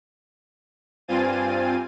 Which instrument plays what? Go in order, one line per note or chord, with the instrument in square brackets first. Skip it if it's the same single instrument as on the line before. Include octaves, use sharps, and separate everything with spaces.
[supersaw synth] G2 C4 F4 G#5 A6 D#7